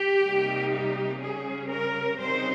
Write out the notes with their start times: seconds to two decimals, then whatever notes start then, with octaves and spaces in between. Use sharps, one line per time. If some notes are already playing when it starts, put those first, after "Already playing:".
Already playing: G4
0.25 C3 G3 A#3 D#4
0.72 G4
1.20 C#3 G3 C#4 G#4
1.69 A#4
2.17 C#3 G3 C4 D#4 C5